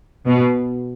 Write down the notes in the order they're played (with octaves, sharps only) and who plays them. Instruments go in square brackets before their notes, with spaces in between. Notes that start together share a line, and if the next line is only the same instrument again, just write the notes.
[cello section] B2